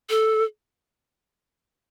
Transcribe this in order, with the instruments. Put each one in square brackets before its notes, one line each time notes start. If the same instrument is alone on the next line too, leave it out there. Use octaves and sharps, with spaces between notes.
[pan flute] A4